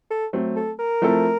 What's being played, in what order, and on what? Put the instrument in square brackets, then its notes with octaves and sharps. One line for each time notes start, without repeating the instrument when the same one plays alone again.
[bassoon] A4
[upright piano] F#3 A3 C4
[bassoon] A4
A#4
[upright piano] F3 A3 C4 E4 A4